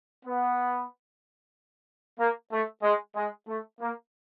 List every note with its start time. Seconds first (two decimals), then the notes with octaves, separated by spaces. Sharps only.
0.25 B3
2.19 A#3
2.51 A3
2.83 G#3
3.15 G#3
3.47 A3
3.79 A#3